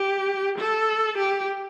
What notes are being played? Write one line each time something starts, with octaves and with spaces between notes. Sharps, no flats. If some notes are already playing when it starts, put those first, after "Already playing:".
Already playing: G4
A4
G4